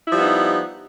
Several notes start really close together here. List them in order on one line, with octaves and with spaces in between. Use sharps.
E4 F3 G3 B3 D#4